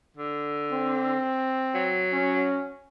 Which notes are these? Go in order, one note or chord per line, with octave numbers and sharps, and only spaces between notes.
D3
C4
F#3
C#4